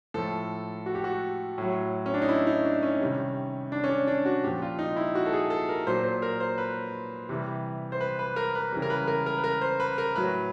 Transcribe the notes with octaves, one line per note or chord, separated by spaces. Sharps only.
A2 F3 A4
F#4
G4
F#4
A2 F#3
C#4
D4
D#4
E4
D#4
D4
C#4
C3 D#3 G3
D4
C#4
D4
D4
F#4
A#2 F3 G4
F4
D#4
E4
F#4
A4
G#4
A4
A#4
A#2 F#3 C5
C5
A#4
C5
B4
C3 E3 G3
C5
B4
B4
A#4
B4
C#3 E3 G3
A#4
B4
A#4
A#4
B4
A#4
C5
B4
A#4
A2 F#3 B4